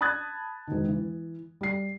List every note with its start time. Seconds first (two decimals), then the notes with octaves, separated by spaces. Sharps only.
0.01 A5 B5 D#6 F#6 G#6 A6
0.67 E1 D#3
0.89 E3
1.61 G3 C7